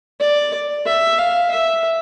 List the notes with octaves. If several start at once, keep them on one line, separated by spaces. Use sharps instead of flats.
D5
E5
F5
E5